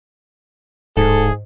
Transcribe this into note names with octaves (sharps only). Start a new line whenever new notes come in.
D1 G#2 G#4 A4